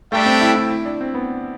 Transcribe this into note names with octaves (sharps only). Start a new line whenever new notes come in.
G3 A3 D4 A4 E5 G5
C4
E4
E4
E4
D4
C4
B3